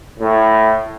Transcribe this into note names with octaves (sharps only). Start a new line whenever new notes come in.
A2